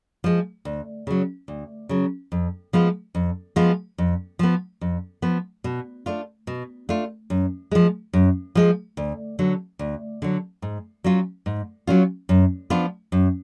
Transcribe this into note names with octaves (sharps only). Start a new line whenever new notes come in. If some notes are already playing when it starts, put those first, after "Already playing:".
F3 G#3
D2
C#3 F#3
D2
C#3 F#3
F2
F3 G#3 B3 F4
F2
F3 G#3 B3 F4
F2
F3 B3
F2
F3 B3
B2
A3 D4 F4
B2
A3 D4 F4
F#2
F3 G#3
F#2
F3 G#3
D2
D3 F#3
D2
D3 F#3
G#2
F#3 C#4 F4
G#2
F#3 C#4 F4
F#2
F3 B3 D4 F4
F#2